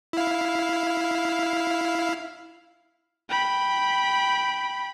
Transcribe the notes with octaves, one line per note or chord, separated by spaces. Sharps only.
E4 F5
G5 B5